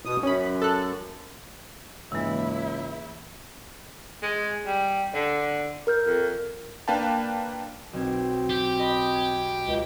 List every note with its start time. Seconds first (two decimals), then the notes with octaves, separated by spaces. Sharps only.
0.05 B2 D#6
0.23 F#2 C#4 B5
0.62 A4 F#6
2.12 C#2 G#2 E3 A#3 E4
4.23 G#3
4.66 G3
5.14 D3 D5
5.87 A#4 F6 G6
6.06 F2
6.88 A#3 D4 B4 F5 G5 A5
7.93 B1 C4 G#6
8.50 G4
8.79 D#5 B5 D#6
9.14 G#6
9.65 C#2